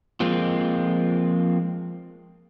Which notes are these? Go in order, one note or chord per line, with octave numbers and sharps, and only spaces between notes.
F3 G#3 A#3 C4 F4